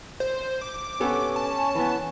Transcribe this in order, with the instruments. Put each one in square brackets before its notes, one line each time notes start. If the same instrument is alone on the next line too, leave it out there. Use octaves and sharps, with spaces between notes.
[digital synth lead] C5
D6
[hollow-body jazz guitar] B3 G4 A4 [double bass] C#4
[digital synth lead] A5
[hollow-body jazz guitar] E3 B3